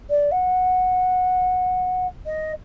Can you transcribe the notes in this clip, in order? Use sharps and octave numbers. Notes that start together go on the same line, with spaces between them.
D5
F#5
D#5